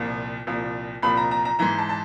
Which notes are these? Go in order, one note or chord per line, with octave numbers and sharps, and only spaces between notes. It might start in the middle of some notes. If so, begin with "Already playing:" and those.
Already playing: C2 A#2 F3
C2 A#2 F3
C2 A#2 F3 B5
A#5
A#5
A#5
G#2 E3 A#5
A5
A5